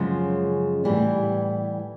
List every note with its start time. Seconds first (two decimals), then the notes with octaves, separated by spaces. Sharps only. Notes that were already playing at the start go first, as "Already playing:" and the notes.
Already playing: F#2 C#3 F3 G#3
0.84 A2 E3 G3 B3